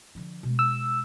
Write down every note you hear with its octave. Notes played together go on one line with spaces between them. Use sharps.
D3 F3
B2 G#3
E6